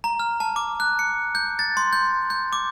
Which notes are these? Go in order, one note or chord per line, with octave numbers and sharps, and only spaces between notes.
A#5
F6
A5
D6
F#6
C#7
G6
A6
C6
G6
G6
D6